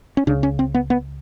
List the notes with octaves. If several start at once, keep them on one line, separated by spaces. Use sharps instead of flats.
C#4
C#2 C#3 D4
C#4
C4
B3
B3